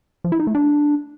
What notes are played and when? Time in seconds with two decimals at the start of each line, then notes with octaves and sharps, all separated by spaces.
0.24 F3
0.32 E4
0.40 D#4
0.47 A3
0.55 D4